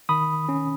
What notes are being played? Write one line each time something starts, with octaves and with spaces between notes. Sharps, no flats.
D#3 B5 D#6
C#4